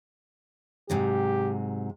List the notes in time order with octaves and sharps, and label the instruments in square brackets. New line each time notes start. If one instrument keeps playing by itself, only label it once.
[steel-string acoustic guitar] G#2 C3 F#3 [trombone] G4